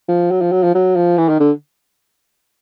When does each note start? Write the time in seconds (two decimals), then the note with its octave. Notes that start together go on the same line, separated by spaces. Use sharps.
0.08 F3
0.31 F#3
0.42 F3
0.52 F#3
0.63 F3
0.75 F#3
0.96 F3
1.18 E3
1.29 D#3
1.40 D3